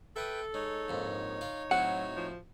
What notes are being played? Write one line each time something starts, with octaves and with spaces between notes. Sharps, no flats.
A4 B4 E5 G5 A5 D#6
G#3 D#4 C#5
A#1 F2 G#2
F4 D5
A2 F#3 C4 F#4 F#5
F3